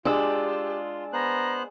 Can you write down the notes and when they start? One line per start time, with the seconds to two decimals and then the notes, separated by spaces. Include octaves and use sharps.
0.05 G#3 D4 F4 G4 E6
1.13 B3 C5 A#5 F#6